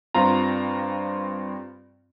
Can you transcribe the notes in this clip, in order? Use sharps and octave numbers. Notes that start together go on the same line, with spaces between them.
G2 C4 F4 A#5